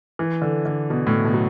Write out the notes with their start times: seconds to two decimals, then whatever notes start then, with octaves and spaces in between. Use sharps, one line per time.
0.19 E3
0.42 D3
0.66 D3
0.90 B2
1.07 A2
1.25 B2
1.34 F#3